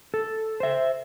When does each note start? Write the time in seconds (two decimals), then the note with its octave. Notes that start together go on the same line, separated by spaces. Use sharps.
0.14 A4
0.60 C5 E5